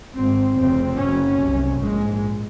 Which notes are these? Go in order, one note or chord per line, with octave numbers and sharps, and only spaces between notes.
G#1 C4
G#2
F1 F2 C#3 C4
F#1 F#2 C#3 C#4
C2 C3
A#1 G#2 G#3